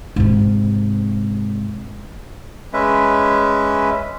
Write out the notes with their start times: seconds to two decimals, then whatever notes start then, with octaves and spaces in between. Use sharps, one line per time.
0.16 G#2 C3
2.73 G#3 C#4 B4 E5